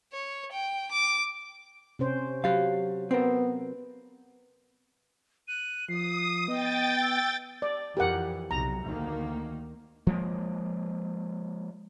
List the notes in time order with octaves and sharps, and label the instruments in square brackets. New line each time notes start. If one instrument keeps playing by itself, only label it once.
[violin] C#5
G5
D6
[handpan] C3 C#4 C5
[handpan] F#3 [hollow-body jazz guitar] G4 F5
[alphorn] B3 [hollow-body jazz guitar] C4 A#4
[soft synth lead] F#6 [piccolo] D#7
[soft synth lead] F3 [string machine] D#6 [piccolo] C7
[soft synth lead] B3 [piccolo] D#5 [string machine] G5 A6
[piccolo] E6
[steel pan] D5
[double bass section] F2 E3 [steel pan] G4 A#4 F#5
[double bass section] B1 C3 F#3 [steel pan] A#5
[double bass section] D2 D#3 A#3
[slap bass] F3 G#3 A#3